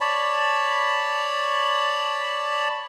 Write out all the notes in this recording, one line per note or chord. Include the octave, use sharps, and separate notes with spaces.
C#5 D5 A5 B5